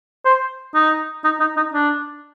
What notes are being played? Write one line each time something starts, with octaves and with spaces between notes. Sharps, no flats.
C5
D#4
D#4
D#4
D#4
D4